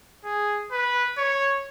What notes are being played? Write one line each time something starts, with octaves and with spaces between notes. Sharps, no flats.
G#4
B4
C#5